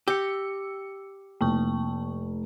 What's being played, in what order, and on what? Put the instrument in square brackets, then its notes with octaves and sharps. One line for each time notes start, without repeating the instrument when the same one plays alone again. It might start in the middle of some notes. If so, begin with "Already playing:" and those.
[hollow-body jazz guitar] G4 [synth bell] E6 C#7
[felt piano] F1 [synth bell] A#3 A5 C#6